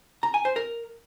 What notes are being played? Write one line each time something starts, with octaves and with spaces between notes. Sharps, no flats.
A#5
G#5
C5
A#4